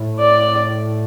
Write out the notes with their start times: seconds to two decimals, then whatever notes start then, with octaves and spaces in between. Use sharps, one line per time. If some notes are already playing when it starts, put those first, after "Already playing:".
Already playing: A2
0.19 D5